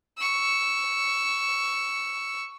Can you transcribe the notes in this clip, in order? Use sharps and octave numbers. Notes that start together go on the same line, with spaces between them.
C#6 E6